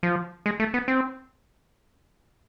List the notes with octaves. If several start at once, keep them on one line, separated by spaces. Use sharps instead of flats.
F3
G#3
A3
B3
C4